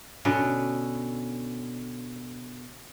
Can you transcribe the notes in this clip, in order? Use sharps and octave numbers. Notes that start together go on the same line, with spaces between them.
B2 D3 C#4